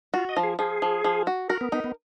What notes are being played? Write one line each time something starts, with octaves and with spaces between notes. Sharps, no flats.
F4 F#4
D#5
F3
G#4
F3 G#4
F3
F3
F#4
F#4 A#4
B3
B3 D#4
B3